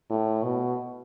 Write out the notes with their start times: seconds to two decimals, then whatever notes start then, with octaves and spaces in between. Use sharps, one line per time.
0.10 A2
0.43 B2